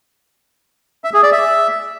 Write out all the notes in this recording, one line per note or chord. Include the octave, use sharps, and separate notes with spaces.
E5
G#4
D5
E5